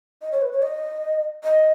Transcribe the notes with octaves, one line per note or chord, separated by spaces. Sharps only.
D#5
C#5
B4
C#5
D#5
D#5